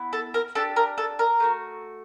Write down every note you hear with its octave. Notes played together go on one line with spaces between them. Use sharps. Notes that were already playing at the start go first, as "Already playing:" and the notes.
Already playing: B3 E4
A4
A#4
D4 G4 A4
A#4
A4
A#4
A3 D4 F#4